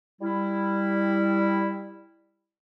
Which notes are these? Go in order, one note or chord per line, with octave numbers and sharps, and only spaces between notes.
G3 E4